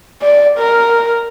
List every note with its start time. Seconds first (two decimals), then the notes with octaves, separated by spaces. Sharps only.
0.22 D5
0.58 A#4